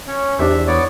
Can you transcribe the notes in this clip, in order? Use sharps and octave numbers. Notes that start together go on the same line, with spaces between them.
C#4 C#5
E2 D4 G4 C5 E5
B3 C#5 D5